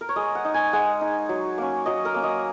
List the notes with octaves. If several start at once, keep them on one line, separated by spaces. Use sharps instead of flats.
A#4
C#5
G#3 D#5
F#5
D#4
G#5
G#3 F#5
D#4
F#3
A#3 C#4
F#3 D#5
A#4
A#3 C#4
D#5